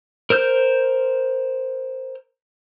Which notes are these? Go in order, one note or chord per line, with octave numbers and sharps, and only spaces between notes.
A#4 C5 F6 G6